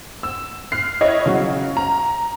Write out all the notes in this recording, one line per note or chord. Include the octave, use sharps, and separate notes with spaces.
E6
F6 F#6 C7
E4 C#5 D#5
C#3 F#3 F#4
A#5